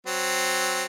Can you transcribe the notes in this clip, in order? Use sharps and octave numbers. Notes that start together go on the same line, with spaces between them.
F#3 C4